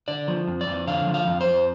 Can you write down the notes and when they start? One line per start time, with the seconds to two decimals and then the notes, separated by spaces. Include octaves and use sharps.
0.08 D3 D5
0.28 F3
0.48 F2
0.61 D5
0.68 F2
0.87 D3 F5
1.07 F3
1.14 F5
1.27 F2
1.41 C5
1.47 F2